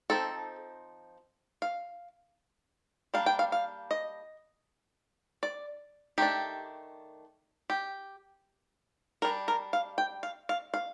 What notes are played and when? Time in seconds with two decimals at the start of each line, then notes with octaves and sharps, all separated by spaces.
0.10 F3 C4 D#4 A4
1.62 F5
3.14 G3 A#3 D4 F5
3.26 G5
3.39 F5
3.52 F5
3.91 D#5
5.43 D5
6.18 D#3 A3 D4 G4
7.70 G4
9.22 G3 D4 A#4
9.48 A#4
9.73 F5
9.98 G5
10.23 F5
10.49 F5
10.74 F5